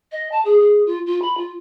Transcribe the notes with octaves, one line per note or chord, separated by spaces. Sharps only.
D#5
A5
G#4
G#4
F4
F4
B5
F4